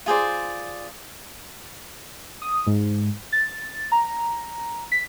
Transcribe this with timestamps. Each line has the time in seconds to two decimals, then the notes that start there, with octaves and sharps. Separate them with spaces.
0.06 F4 G#4 C5 D5
2.42 D#6
2.67 G#2
3.32 A6
3.92 A#5
4.92 B6